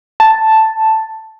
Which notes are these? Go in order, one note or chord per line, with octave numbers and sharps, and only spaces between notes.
A5